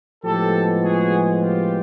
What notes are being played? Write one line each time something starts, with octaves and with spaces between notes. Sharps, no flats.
A2 F3 G#3 B3 G4 A4
F#4 G#4
F4 G4